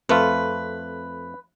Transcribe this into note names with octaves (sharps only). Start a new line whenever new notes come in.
F2 A3 F4 B4